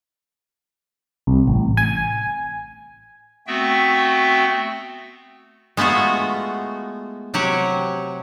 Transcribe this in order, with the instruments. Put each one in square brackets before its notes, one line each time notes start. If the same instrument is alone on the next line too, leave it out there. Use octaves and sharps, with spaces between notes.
[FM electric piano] C2
A1
G#5
[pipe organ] A3 B3 C4 F#4 E5 G5
[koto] G#3 A3 B3 F4 F#4
C3 F#3 G4 C#5 F#5